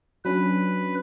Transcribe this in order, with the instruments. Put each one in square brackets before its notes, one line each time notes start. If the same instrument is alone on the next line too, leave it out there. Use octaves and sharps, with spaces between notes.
[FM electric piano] F#3 C#4 D4 [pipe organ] B4